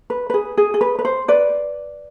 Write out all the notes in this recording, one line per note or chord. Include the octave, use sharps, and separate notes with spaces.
B4
B4
G#4
G#4
G#4
B4
B4
C5
B4 D5